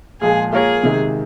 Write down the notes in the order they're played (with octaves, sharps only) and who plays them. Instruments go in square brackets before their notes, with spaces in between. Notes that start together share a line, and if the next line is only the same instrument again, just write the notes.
[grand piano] A#2 F3 G#3 [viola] G#4
[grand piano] A#3 F4 A#4 C#5 [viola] G#4
[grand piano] C3 D#3 G#3